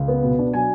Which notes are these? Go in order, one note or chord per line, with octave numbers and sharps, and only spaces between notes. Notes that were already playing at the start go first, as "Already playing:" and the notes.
Already playing: C#2
B3
B2
D4
F#3 G#5